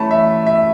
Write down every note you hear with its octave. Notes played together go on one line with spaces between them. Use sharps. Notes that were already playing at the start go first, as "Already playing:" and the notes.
Already playing: E3 A3 C#4 A5 B5
E5
E5